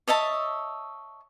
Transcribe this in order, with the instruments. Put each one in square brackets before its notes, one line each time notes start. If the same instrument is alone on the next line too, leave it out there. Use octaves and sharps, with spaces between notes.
[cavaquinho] C#5 D#5 E5 A5